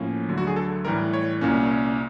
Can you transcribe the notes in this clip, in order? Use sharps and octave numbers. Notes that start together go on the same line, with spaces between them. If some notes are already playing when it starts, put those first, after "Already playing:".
Already playing: A2 F3 A#3 C#4
D2 D3 F#3
F#4
G#4
A4
A2 E3 G3 A#4
C#5
C2 A#2 G3 A#3 C#4